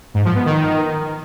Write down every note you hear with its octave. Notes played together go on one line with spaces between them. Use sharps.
G#2
F3
B3
D#3